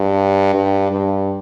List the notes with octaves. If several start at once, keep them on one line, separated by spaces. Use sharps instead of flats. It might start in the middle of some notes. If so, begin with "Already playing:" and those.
Already playing: G2
G2
G2